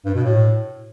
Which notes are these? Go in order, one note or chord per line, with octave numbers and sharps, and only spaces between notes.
G2
B2
A2